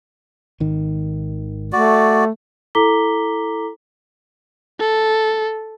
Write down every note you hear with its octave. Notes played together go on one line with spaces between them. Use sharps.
G#1 D#3
A3 F#4 D5
E4 A4 A#5 D6 B6 G7
A4